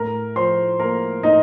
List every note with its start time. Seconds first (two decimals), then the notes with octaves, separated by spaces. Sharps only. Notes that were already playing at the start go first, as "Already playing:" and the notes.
Already playing: A2 A#4 A#5
0.36 F3 C5 C6
0.79 A#3 A#4 A#5
1.23 A2 D#4 D#5